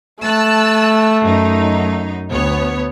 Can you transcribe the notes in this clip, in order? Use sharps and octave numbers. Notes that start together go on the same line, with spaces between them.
A3 A5 E6 F#6
F#2 D#4
D2 B3 C#5